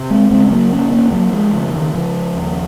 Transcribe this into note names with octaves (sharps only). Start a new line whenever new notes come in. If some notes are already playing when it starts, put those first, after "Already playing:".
Already playing: C3
G#3 C4
C#3 G#3 C4
C4
F#3 A#3
F2 A#3 C#4
A#3 C#4
F2 F#3 A#3
F3 G#3
C#3 F3
D#3
C#3 F3
D#2